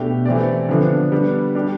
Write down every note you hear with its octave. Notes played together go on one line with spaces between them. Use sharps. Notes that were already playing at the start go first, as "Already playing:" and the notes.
Already playing: B2 A3 D4 G4
E3 A3 C4 G4 D5
D3 F3 B3 D4
G3 B3 D4
G3 D4 G4